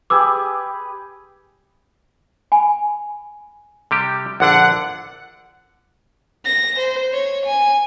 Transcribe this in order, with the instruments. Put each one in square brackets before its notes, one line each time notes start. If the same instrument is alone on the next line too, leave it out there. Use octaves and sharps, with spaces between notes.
[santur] G4 G#4 B4 [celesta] D6 E6
[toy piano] G#5 B5
[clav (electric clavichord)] C3 G3 G4
[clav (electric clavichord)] A#1 D3 D4 [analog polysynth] F#5
[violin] A#6
C5
C#5
G#5